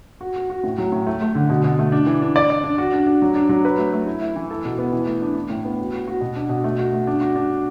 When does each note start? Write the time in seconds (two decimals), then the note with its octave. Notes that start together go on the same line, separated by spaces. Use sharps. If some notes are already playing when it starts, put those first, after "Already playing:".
0.21 F#4
0.36 F#4
0.50 F#4
0.64 A2
0.78 F#3
0.92 A2
1.06 A3
1.22 A3
1.35 D3
1.50 B2
1.64 B2
1.79 A3
1.92 D4
2.06 E3
2.22 D4
2.36 D5
2.50 D5
2.64 D4
2.78 F#4
2.93 D4
3.06 D4
3.22 F#3
3.35 D4
3.49 F#3
3.65 B4
3.78 A3
3.93 A3
4.06 E4
4.21 E4
4.36 E3
4.51 A4
4.65 B2
4.78 B3
4.92 E3
5.06 A3
5.22 D4
5.36 D4
5.50 A2
5.65 B3
5.79 F#4
5.93 F#4
6.08 F#4
6.21 B2
6.36 D4
6.49 B2
6.64 A3
6.79 F#4
6.93 A3
7.07 D4
7.21 F#4
7.36 D4